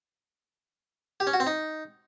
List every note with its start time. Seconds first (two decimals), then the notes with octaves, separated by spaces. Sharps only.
1.20 G4
1.27 C#4
1.33 F#4
1.40 C4
1.47 D#4